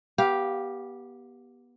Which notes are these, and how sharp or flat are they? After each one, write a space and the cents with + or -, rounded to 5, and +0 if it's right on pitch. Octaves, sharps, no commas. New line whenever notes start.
B3 -25 G4 +0 F5 +0